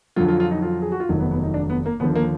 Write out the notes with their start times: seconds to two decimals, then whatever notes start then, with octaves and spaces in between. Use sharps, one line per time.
0.16 F2 D3 F#3 F4
0.28 F4
0.40 F4
0.51 D#4
0.62 F4
0.82 G#4
0.92 F#4
1.00 F4
1.09 F1 D#2 D#3 F#3 D#4
1.20 B3
1.31 B3
1.43 D#4
1.54 D4
1.70 B3
1.86 A#3
2.00 D#2 D3 F3 B3
2.15 A#3